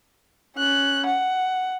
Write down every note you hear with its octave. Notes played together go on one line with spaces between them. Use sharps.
C#4 F#6
F#5